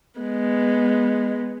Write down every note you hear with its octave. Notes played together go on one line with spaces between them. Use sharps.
G#3 B3